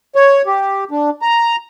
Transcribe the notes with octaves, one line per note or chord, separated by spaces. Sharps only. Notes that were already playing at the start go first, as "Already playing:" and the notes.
C#5
G4
D4
A#5